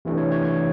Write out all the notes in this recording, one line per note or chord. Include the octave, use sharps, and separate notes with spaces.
C3 E3 A3 D4
C#5
C#5
C#5